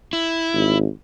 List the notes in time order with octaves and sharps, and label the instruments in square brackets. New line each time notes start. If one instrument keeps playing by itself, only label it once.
[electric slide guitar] E4
[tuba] G#1